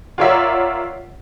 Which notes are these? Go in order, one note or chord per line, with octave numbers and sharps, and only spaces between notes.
F4 A#4 C#5 D5 E5 F#5